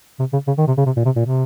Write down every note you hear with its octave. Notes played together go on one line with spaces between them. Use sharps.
C3
C#3
C#3
D#3
C3
C#3
C3
A#2
C3
A#2
C3